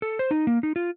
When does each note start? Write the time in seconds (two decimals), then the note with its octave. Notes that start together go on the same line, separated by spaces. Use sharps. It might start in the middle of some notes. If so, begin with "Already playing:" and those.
0.02 A4
0.19 C5
0.31 D#4
0.47 A#3
0.63 D#4
0.76 F4